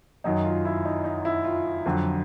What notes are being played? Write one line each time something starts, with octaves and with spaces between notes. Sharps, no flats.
F#2 D#3 F#3 D#4
F4
E4
D#4
D#4
E4
F4
F2 D3 F#3